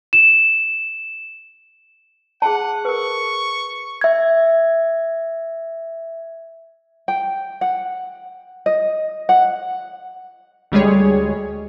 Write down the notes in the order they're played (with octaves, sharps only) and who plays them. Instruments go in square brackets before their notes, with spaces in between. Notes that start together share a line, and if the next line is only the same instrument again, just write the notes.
[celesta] E7
[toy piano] G#4 A5 [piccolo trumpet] F#5
[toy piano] A#4 B4 [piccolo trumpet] C#6
[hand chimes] E5 G#6
[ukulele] G5
F#5
D#5
F#5
[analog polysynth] D2 G3 G#3 G#4 C#5